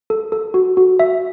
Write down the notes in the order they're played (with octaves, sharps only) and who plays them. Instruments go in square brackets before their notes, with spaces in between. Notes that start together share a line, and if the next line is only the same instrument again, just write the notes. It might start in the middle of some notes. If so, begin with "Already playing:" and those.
[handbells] A4
A4
F#4
F#4
E5